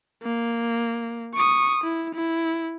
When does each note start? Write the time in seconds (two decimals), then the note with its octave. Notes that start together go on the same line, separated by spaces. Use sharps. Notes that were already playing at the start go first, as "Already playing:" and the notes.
0.23 A#3
1.35 C#6 D#6
1.84 E4
2.15 E4